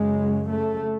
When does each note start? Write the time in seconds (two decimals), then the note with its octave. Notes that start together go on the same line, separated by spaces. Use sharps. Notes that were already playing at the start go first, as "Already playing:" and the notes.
Already playing: F#2 C#3 G#3
0.49 A3